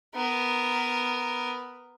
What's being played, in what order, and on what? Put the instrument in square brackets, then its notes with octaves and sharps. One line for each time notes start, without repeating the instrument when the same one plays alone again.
[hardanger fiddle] B3 A#4